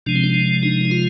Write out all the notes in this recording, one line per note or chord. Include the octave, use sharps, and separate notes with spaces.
C3 F3 G#3 D4
C4
D4
D4
D#4
D#4
F4